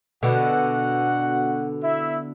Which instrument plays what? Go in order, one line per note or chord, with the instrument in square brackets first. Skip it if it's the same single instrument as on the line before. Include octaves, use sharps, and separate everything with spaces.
[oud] B2 D3 [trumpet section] F#4 F#5
[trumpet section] E4 E5